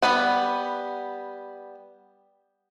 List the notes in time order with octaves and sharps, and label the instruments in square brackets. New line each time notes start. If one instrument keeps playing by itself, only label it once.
[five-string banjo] G3 B3 B4 F#5